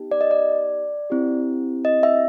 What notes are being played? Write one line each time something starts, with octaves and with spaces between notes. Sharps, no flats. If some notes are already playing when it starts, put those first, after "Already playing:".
Already playing: B3 D#4 G4
D5
D#5
D5
C4 E4 G4
D#5
E5